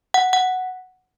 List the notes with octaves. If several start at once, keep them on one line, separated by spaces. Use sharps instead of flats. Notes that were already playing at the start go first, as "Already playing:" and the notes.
F#5
F#5